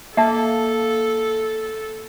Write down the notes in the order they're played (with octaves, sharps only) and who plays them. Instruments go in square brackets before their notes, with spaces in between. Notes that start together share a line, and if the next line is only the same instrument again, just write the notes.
[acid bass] A#3 [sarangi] A4 [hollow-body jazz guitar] E5 A5